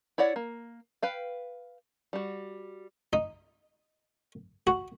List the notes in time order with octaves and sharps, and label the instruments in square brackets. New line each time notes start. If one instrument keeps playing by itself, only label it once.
[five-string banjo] E4 C#5 D5 F#5
A#3
B4 F5 G5
G3 F#4
[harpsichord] D#4
F#4